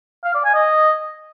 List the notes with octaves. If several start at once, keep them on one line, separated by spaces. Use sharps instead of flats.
F5
D5
G#5
D#5